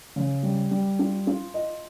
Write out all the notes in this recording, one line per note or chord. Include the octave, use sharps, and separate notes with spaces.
C#3
G3
G3
F4
F4
D#5